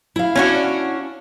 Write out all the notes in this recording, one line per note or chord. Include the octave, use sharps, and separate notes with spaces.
E4 F5
C#4 D4 F#4